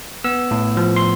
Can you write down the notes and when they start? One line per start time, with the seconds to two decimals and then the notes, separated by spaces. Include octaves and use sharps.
0.24 B3 E6
0.51 A2
0.77 F3
0.96 C6